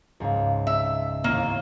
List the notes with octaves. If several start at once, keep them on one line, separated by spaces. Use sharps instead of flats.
C#2 G#2 C#3
E5
A1 D#2 A#3